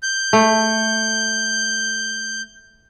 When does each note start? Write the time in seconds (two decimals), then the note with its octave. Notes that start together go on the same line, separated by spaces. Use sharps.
0.03 G6
0.33 A3